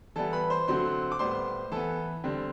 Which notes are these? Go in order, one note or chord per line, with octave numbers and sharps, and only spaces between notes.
E3 G3 B3 A4 A5
B4 B5
C5 C6
D3 F#3 A3 C4 C5 C6
D6
A2 G3 B3 C5 C6
E3 B3 A4 A5
D3 G3 C4